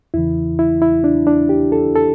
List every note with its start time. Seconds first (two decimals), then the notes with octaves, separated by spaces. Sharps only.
0.14 E2 C#3 E3 E4
0.59 E4
0.82 E4
1.04 D4
1.27 D4
1.49 G4
1.72 A4
1.96 A4